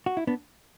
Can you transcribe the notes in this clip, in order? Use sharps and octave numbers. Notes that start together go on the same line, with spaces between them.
F#4
E4
B3 D4